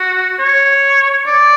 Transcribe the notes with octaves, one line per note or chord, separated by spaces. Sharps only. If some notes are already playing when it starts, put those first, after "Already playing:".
Already playing: F#4
C#5
D5